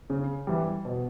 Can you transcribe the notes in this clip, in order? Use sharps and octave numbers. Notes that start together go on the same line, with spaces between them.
C#3
E3 G3
B2